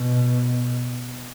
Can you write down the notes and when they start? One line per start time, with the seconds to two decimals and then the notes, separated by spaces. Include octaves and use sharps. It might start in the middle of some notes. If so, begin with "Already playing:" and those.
Already playing: B2